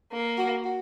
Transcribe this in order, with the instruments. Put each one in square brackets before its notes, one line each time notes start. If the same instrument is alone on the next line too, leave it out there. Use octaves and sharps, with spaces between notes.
[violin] A#3
[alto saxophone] F#4
F#4